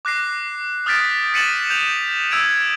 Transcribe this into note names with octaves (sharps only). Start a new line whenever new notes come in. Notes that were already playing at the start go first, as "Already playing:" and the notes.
D6 F#6 A#6 C7
D#6 F6 G6 A6 B6 D7
A6 B6 C#7 D#7 E7 F#7
G6 F7
E6 G#6 D7 F7